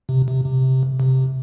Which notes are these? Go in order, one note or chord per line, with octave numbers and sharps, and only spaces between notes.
C3
C3
C3
C3